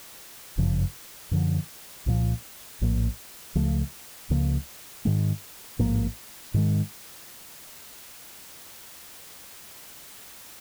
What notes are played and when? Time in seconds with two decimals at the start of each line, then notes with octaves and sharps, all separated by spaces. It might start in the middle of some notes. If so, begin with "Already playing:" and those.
0.57 G1 F#2 C#3 F3
1.31 F#2 D3 F3
2.06 C2 A#2 F3
2.81 A#1 A2 F3 A#3
3.55 C#2 C#3 F3 A3
4.30 C#2 C#3 F3 A#3
5.05 G#2 D#3 G#3
5.79 A1 G#2 F3 A#3
6.54 G#2 D#3 G#3